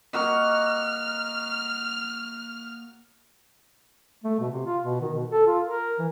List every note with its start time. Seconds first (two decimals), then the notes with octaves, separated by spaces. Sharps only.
0.13 A#3 F#4 D#5 F6
4.24 A3
4.39 B2
4.51 C3
4.66 F4
4.83 B2
5.01 D#3
5.14 B2
5.30 A4
5.47 F4
5.67 A#4
5.99 E3